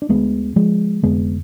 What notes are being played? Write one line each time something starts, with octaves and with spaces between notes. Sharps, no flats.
D4
D2 D3 G#3 B3
F3 G#3
F1 F2 D3 G#3 B3